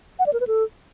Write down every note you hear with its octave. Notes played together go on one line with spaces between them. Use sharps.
F#5
D5
A#4
B4
A4